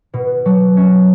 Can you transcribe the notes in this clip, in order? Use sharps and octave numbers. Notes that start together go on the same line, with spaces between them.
B2
F#3
C#4